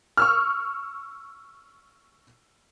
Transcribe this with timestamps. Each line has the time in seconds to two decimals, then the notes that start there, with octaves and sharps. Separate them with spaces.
0.17 C#6 E6 F6